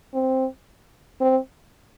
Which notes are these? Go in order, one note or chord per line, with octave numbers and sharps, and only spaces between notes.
C4
C4